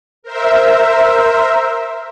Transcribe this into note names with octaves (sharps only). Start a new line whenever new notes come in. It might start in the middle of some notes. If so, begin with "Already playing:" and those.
A#4 C5 E5